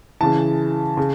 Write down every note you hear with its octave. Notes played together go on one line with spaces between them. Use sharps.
C#3 E3 A5
C#3